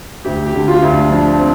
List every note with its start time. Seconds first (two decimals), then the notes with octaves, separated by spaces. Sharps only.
0.25 D2 G4
0.46 G4
0.54 D3
0.68 F4
0.82 D2
0.90 D4
1.10 F3 D4
1.39 C4